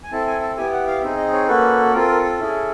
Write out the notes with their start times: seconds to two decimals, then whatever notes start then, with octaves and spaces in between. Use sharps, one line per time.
0.04 G#5
0.12 C4 E4 A4 A5
0.27 G#5
0.41 A5
0.57 B3 E4 G4 G#5
0.72 F#5
0.87 F5
1.02 C4 D#4 G#4 E5
1.17 D#5
1.33 C#5
1.48 A#3 C#4 F#4 A4 B4
1.93 C4 F4 A4 A#4
2.08 A#4
2.23 A4
2.38 C#4 E4 G#4